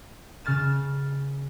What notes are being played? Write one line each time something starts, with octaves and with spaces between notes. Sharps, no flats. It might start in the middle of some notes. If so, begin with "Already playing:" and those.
C#3 F6 A6 E7